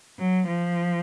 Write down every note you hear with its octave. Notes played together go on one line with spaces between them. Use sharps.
F#3
F3